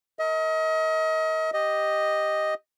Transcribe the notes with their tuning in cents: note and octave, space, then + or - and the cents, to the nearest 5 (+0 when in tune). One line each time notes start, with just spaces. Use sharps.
A#4 -30 D#5 +35
G4 +0 D#5 +0